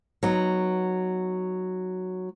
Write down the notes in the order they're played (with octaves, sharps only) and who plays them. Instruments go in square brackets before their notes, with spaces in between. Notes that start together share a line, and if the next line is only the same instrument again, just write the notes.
[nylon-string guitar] F#3 B3 D#4